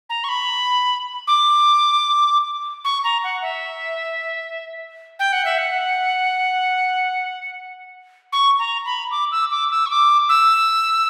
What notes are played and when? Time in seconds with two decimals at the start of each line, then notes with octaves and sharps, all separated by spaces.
0.10 A#5
0.24 C#6
0.29 B5
1.27 D6
2.85 C#6
3.04 A#5
3.24 F#5
3.42 E5
5.19 G5
5.33 F#5
5.45 E5
5.58 F#5
8.33 C#6
8.59 A#5
8.86 B5
9.11 D6
9.32 E6
9.51 D6
9.71 E6
9.86 C#6
9.90 D6
10.29 E6